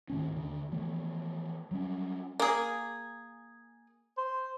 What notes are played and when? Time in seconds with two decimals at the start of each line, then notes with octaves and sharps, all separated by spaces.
0.10 G#2 D#3 A3 C#4
0.32 D#2 D3
0.72 E3 F3 A3 B3
1.71 F#3 G3 B3 C#4
2.40 A#3 G#4
4.18 C5